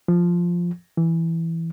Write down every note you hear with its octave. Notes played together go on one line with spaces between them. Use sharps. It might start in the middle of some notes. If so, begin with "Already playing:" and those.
F3
E3